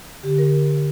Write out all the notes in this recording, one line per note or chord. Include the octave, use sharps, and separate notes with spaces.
D3 G4
A#4